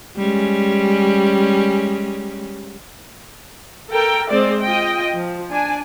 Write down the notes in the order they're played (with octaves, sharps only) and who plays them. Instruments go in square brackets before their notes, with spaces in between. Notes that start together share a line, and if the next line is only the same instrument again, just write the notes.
[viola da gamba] G3 G#3 C#4
[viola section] A4 A#4 G5
G#3 C4 C5 D5
F4 D#5 G5
F3
D4 G#5